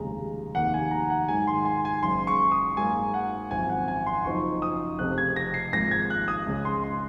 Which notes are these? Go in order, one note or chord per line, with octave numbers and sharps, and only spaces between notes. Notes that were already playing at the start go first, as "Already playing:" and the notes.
Already playing: F1 D#2 C#3 G#3 A#5
F1 D#2 D#3 A#3 F#5
G#5
A#5
F#5
G#2 D#3 F#3 G#5
C6
G#5
G#5
F#1 F#2 C#3 G#3 C6
C#6
D#6
G#2 F#3 A#3 G#5
F#5
G#1 F#2 F3 C4 G#5
F#5
G#5
C6
F#1 F#2 F3 C4 D#4 C#6
D#6
F1 F2 C#3 F3 C4 F#6
G#6
A#6
C7
G#1 G#2 F3 A#3 A#6
G#6
F#6
D#6
C#2 C#3 G#3 C#4
C6
C6